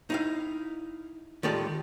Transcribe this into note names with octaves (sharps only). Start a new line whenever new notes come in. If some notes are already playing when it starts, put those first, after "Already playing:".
D#4 E4 F5
D#3 G#3 F4 G4 A4 D5